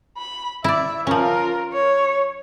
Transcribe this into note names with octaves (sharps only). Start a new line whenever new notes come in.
B5
E4 D5 E5
F3 C#4 F4 A#4
C#5